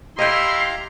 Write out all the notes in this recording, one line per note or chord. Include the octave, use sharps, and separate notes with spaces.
E4 G4 D#5 F5 G5 A#5 C6